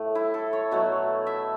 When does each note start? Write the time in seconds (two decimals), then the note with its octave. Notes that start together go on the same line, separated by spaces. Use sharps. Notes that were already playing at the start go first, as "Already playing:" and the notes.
Already playing: A2 A3
0.15 E4
0.34 A4
0.53 C#5
0.71 B2 F#3 A3
1.27 E5